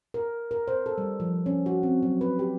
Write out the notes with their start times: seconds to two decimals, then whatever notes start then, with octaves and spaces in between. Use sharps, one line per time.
0.14 A#4
0.51 A#4
0.68 C5
0.86 A4
0.98 G3
1.20 F3
1.46 C#4
1.66 F#4
1.83 C4
2.03 F#3
2.21 B4
2.39 G4